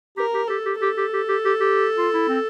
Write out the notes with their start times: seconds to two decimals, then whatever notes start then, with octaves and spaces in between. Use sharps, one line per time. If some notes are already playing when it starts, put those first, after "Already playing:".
0.17 G4 A#4
0.34 G4
0.48 G4 A4
0.65 G4
0.78 G4 A4
0.97 G4
1.13 G4
1.29 G4
1.45 G4
1.60 G4
1.98 F4
2.14 E4
2.28 C4